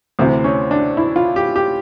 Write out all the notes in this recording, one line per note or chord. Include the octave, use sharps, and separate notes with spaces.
D2 C3 E3 C4
C#4
D4
E4
F4
G4
G4